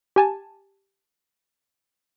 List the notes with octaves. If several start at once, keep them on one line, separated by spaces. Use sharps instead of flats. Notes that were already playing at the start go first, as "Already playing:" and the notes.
G4 G#5 A5